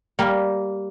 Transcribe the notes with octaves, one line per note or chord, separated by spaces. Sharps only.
G3 A#3